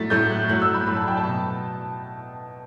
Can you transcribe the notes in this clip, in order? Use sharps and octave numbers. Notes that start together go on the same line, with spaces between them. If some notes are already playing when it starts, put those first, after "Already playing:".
Already playing: A2 F#3 A3 A6 B6
A2 F#3 A3 G6
F#6
A2 F#3 A3 F#6
E6
B5
A2 F#3 A3 B5
A5
G5
A5
B2